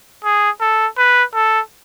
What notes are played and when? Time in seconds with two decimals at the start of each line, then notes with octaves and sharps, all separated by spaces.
0.24 G#4
0.61 A4
0.98 B4
1.34 A4